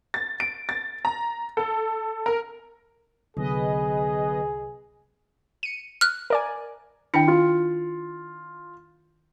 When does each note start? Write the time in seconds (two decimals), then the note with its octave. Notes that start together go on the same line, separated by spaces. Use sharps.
0.14 A6
0.40 D7
0.69 A6
1.05 A#5
1.57 A4
2.26 A#4
3.37 C2 D3 F#3 B3 G#4 B4 D#5
5.63 C#7 D#7
6.01 F6 F#6
6.30 A#4 D5 G#5
7.14 D#3 D4 E4 G5 C#7
7.28 F4